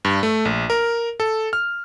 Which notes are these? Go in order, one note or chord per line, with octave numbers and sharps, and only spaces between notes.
G2
A3
A#1
A#4
A4
F6